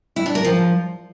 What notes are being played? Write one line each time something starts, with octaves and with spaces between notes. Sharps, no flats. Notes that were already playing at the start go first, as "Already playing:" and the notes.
E4
D4
A#4
F3